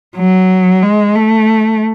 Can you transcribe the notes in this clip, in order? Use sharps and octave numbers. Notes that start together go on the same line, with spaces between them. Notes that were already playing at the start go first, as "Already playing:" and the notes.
F#3
G#3
A3